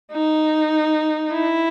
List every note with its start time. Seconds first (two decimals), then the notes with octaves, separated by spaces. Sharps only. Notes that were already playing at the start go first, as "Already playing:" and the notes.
0.12 D#4
1.32 E4